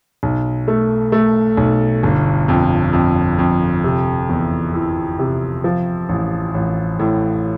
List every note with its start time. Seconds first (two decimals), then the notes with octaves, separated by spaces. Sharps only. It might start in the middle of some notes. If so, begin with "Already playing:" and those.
0.23 B1
0.68 A3
1.12 A3
1.57 B1
2.03 G1
2.48 F2
2.93 F2
3.39 F2
3.84 C3
4.29 E2
4.74 E3
5.19 C3
5.64 F3
6.09 A1
6.54 A1
6.99 A2